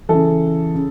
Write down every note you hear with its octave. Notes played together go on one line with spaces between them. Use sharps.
C#3 E3 A4
C#3